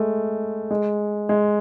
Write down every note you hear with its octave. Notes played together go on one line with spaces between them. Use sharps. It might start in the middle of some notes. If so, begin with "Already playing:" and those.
Already playing: G#3 A3
G#3
G#3